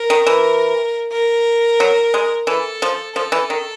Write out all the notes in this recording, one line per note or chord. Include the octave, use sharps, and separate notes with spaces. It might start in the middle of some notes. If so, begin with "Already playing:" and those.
Already playing: A#4
D#3
E3
A#4
F#3
G#3
E3 A4
F3
F3 A4
E3
D#3